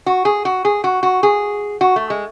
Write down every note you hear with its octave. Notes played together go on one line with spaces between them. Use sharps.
F#4
G#4
F#4
G#4
F#4
F#4
G#4
F#4
A3
G#3